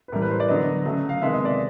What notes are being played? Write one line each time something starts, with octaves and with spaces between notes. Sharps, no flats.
B4
A2 E3 G3 A#4
B4
C5
D5
D3 F#3 B3 D#5
C#3 F#3 A3
F5
C3 D#3 G#3 B3 E5
D#5
D5